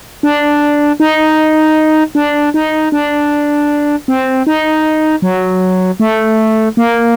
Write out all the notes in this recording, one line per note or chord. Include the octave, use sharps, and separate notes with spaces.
D4
D#4
D4
D#4
D4
C4
D#4
F#3
A3
A#3